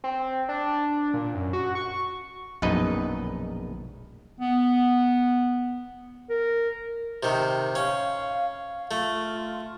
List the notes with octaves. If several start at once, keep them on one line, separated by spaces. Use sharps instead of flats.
C4
D4
A#2
F#2
F#4
C#6
A#1 F#2 B2 D#4 B4 D#5
B3
A#4
C3 D#3
C#4 F5
F5
A3 F4